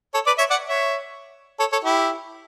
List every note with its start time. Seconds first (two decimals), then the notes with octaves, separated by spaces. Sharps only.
0.14 A4 C#5
0.27 B4 D5
0.38 C#5 E5
0.50 D5 F#5
0.68 C#5 E5
1.59 A4 C#5
1.72 A4 C#5
1.84 E4 G4